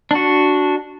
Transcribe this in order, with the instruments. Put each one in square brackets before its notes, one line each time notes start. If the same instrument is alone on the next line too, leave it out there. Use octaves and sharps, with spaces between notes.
[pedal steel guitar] D4 F#4